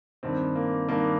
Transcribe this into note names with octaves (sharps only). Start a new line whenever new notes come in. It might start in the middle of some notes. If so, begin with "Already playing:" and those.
G2 D#3 C4
A#3
G2 D#3 A#3